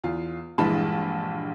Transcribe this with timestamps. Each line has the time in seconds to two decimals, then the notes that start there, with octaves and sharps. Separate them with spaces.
0.04 E2 F4
0.58 A#1 G2 E3 G#3 A5 B5